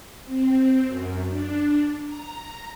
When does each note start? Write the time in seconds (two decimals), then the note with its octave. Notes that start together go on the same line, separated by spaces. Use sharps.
0.24 C4
0.86 F#2
1.30 D4
2.06 A#5